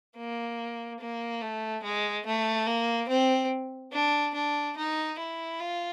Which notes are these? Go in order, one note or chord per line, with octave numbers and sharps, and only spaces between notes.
A#3
A#3
A3
G#3
A3
A#3
C4
D4
D4
D#4
E4
F4